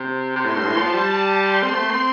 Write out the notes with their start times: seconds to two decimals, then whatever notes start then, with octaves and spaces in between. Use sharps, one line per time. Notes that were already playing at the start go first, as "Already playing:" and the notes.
Already playing: C3
0.36 C3
0.45 A2 C6
0.55 G2
0.66 A2
0.77 F3 A5
0.94 G3
1.41 C6
1.63 C4
1.75 A3
1.91 C4